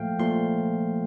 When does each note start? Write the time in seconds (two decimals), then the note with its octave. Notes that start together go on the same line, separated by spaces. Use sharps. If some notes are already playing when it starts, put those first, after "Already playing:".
Already playing: A#2 F3 A3 F5 G5
0.19 A#2 F3 A3 C6